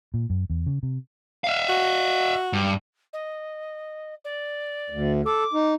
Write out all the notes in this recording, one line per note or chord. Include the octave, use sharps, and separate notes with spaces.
A#2
F#2
E2
C#3
C3
E5 F5
F#4
G2
D#5
D5
D2
A4 D6
D#4